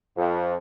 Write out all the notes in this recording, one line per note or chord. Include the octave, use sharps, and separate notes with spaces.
F2